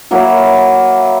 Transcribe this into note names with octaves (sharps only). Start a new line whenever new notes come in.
F#3 A#3 E4